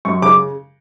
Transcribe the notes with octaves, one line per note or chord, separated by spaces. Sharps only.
F#2 C#6
C#3 D6